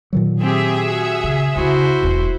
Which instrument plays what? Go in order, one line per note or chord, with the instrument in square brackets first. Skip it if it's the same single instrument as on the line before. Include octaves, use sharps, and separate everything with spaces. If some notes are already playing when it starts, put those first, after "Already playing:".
[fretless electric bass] A#2 D#3 F#3
[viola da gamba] C4 G4 [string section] G#4 E5
[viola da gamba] F#4
[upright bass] C#3
[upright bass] D2 C#3 [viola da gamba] E4 F#4 C5
[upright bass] E1 E2